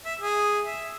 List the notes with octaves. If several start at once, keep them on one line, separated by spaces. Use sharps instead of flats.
E5
G#4
E5